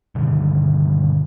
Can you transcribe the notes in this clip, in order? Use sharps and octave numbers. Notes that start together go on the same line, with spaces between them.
G2 B2 D3 D#3